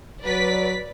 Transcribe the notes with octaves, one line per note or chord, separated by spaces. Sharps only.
F#3 B4 D5 B6